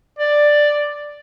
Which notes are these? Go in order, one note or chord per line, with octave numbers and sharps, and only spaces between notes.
D5